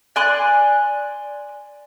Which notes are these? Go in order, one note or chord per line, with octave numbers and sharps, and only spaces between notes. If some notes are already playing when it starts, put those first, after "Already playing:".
D5 G#5 C6 F#6